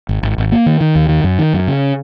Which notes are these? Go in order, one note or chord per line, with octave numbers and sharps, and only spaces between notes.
G#1
G#1
G#1
A#3
D#3
D#3
D#2
D#3
F#2
D#3
F#2
C#3